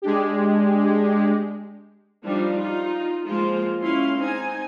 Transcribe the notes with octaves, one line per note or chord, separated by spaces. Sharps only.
G#3 D4 G4
F3 G3 D4 D#4 F4
D#4 F4
F3 G#3 A#3 F4 C5
G#3 C#4 E4 F5 C6
C4 D#4 G#5